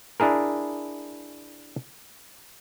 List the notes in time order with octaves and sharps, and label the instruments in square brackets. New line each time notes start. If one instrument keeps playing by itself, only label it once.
[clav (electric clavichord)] D4 E4 G#4 A#4